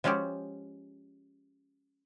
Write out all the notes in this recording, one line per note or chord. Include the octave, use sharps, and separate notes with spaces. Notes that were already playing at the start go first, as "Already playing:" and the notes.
F3 G#3 C#4 F#4 G4